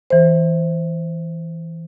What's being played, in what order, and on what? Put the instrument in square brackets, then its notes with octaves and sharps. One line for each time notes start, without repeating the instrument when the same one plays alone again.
[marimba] E3 C5